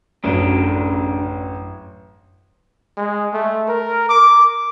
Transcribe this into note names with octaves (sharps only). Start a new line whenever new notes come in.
A1 F#2 C#3 F#3 D4
G#3
A3
A#4
D6